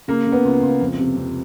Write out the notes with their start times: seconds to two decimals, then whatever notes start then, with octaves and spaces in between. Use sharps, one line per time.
0.08 C#3 A#3
0.26 C#3
0.32 B3
0.45 C#2
0.63 C#2
0.81 F2
0.99 C3
1.16 F2